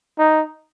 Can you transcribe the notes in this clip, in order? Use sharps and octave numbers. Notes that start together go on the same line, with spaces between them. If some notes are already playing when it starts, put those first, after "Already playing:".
D#4